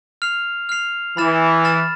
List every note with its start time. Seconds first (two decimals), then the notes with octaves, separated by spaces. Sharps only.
0.22 F6 C7 F7
0.69 F6 C7 F7
1.17 E3 B5 F6 A6 E7
1.64 B5 F6 A6 E7